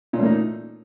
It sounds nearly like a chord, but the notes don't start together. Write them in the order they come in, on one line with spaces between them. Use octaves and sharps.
A#2 C#4 A3 A#3 D#4